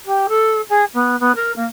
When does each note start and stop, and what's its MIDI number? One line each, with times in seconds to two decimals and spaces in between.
0.05 0.26 67
0.28 0.61 69
0.69 0.84 68
0.93 1.18 59
1.19 1.31 59
1.35 1.52 70
1.56 1.65 58